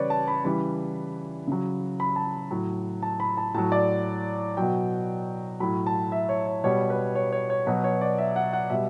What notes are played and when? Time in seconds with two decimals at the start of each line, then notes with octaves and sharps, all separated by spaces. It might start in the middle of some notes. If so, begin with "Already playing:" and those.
Already playing: C#3 E3 G3 B4 C#5 D5
0.10 A5
0.28 B5
0.44 C#3 E3 G3 B5
1.47 C#3 F#3
2.00 B5
2.16 A5
2.51 A2 F#3
3.02 A5
3.20 B5
3.37 A5
3.54 A2 F#3 A5
3.72 D5
4.57 B2 F#3 G5
5.60 A2 F#3 B5
5.87 A5
6.12 E5
6.29 C#5
6.46 C#5
6.64 B2 G3 C#5
6.90 B4
7.15 C#5
7.32 C#5
7.50 C#5
7.67 B2 F#3 B4
7.84 C#5
8.01 D5
8.18 E5
8.36 F#5
8.53 F#5
8.70 B2 G3 E5